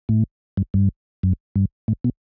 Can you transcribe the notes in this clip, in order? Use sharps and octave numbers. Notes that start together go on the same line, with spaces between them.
A2
G2
G2
F#2
G2
A2
B2